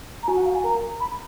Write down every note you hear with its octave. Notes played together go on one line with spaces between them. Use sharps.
A#5
F#4 G#5
F#5
F5
G#5
A#4 A#5
B5